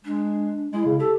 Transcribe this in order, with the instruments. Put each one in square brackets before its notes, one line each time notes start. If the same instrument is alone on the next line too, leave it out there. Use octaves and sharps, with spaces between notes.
[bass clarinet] G#3 [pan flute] D4
[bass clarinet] G#3 [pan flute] E4
[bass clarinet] C#3
[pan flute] G4 [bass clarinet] A4